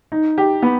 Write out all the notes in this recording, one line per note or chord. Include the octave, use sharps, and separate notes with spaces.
D#4
G4
B3